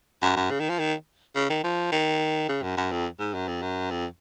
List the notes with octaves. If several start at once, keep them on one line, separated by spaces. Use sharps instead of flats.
F#2
F#2
C#3
D#3
F3
D#3
C#3
D#3
F3
D#3
C#3
F#2
F#2
F2
G#2
F#2
F2
F#2
F2